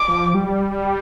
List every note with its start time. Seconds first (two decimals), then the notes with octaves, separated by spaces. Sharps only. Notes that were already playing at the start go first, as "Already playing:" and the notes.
Already playing: D6
0.08 F3
0.34 G3